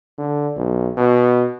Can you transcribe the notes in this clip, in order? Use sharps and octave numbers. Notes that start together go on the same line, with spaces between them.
D3
B1
B2